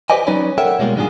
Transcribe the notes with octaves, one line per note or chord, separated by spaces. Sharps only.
G4 B4 C5 D5 D#5 G#5
F#3 C#4 D#4 B4 C#5 D5
A4 A#4 C#5 E5 F#5 G5
B2 G3 G#3 A#3 B3 F4
G#2 D#3 G3 D4 F4 G#4